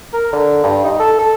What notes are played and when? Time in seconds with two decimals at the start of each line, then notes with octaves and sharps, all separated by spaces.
0.13 A#4
0.33 D3
0.63 G2
0.84 D#4
1.00 A4
1.19 A4